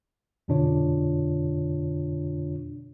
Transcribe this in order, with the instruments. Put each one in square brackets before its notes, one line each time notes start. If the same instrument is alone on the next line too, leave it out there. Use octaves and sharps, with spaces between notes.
[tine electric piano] F2 B2 D3 D4 F4 C#5